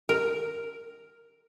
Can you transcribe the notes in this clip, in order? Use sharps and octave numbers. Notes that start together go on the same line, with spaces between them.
A#4